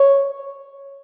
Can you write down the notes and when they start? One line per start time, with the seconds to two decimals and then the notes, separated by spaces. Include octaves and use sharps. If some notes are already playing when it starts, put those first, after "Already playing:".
Already playing: C#5